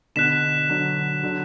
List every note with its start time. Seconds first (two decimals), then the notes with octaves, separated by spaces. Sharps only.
0.16 B2 D3 F#6 B6 E7
0.70 D3 F#3
1.23 D3 F#3